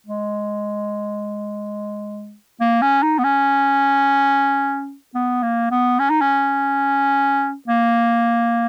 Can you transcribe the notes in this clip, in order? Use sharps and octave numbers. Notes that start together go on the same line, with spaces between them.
G#3
A#3
C#4
D#4
B3
C#4
B3
A#3
B3
C#4
D#4
C#4
A#3